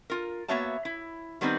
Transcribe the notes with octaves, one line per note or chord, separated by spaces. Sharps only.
F4 A#4
A#3 B3 F#4 C#5 E5 A5
E4
D#3 G3 B3 C4 D4 D#4